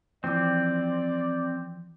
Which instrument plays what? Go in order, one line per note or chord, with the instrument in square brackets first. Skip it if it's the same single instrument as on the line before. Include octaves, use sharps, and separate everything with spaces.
[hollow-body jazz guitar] E3 F3 [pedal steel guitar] C4 [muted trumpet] D5